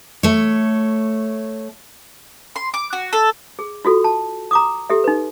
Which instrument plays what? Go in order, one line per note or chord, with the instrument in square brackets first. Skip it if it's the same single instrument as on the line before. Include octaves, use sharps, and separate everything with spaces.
[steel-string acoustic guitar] A3 C#5
[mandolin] C6
D6
F#4
A4
[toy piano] G#4
F4 F#4 A4
A5
A#5 D6 D#6
G4 A4 E5
D#4 B4